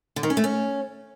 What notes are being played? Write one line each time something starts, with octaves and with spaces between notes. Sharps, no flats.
D3
D#3
C#4
A3
C#4